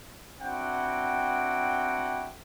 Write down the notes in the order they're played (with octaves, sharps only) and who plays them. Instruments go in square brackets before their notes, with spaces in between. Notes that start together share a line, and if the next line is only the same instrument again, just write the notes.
[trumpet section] C4 D4 E4 F#4 F#5 G5